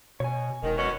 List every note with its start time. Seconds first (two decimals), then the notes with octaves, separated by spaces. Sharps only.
0.20 B2 C#5 G#5
0.63 E1 D#3
0.77 F#2 B2 C#4